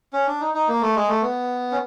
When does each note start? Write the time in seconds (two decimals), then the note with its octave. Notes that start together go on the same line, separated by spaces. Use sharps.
0.13 C#4
0.27 D4
0.40 D#4
0.54 D#4
0.68 A#3
0.81 A3
0.95 G#3
1.08 A3
1.22 B3
1.72 C#4